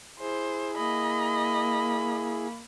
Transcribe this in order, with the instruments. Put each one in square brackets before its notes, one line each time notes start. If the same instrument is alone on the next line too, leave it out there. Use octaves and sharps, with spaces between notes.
[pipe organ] E4 G#4 [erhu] C5
[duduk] A#3 [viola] D#5 [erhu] B5